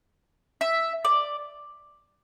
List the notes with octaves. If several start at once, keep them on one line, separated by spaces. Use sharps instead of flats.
E5
D5